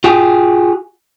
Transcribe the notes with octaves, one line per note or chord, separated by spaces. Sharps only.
F4 F#4 G#4 G5